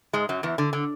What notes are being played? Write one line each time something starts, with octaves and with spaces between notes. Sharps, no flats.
G#2 G#3
F#2 F#3
E2 E3
D3
D3